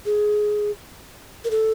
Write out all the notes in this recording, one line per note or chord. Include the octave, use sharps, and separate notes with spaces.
G#4
A#4
A4